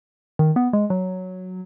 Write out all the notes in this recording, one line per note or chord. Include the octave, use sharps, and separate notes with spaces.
D#3
B3
G#3
F#3